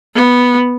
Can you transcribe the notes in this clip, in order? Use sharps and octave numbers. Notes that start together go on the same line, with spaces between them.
B3